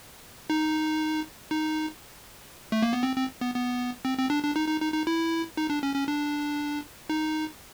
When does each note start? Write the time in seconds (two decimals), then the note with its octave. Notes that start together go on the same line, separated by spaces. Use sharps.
0.50 D#4
1.51 D#4
2.72 A3
2.82 A#3
2.93 B3
3.03 C4
3.16 C4
3.41 B3
3.55 B3
4.05 C4
4.18 C4
4.30 D4
4.43 D4
4.56 D#4
4.68 D#4
4.81 D#4
4.93 D#4
5.07 E4
5.57 D#4
5.70 D4
5.83 C#4
5.95 C#4
6.08 D4
7.10 D#4